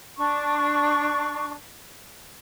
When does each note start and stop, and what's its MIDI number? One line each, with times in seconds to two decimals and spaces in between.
0.17 1.52 62
0.17 1.52 85